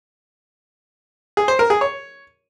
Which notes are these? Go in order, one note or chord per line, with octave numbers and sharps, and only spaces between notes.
G#4
C5
A#4
G#4
C#5